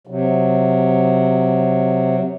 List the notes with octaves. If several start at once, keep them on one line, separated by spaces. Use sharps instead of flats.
C3 F#3